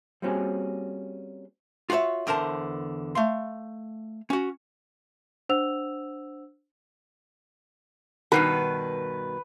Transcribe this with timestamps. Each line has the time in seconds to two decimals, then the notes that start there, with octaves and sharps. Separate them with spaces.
0.22 G3 A#3 C4 C#4 F#4 G#4
1.90 F4 F#4 A#4 C#5 E5
2.27 E2 D3 A#4 C5 A5
3.15 A3 F5 C6
4.30 C#4 F#4
5.49 D4 C5 F#5 E6 F7
8.32 G2 B2 D#3 B4